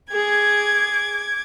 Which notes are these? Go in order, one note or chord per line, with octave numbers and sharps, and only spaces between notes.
G#4 D6 G#6